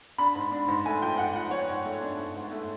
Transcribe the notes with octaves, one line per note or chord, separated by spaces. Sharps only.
D4 B5
G#2
D4
G#2
A3 G#5
F3 G5
G#2 F#5
F3 F#5
G#2 C#5
G#2
A3
D4
G#2
G#2
A3